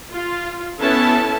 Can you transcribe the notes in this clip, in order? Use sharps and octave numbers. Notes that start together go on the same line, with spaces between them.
F4
B3 C#4 E4 A4 A5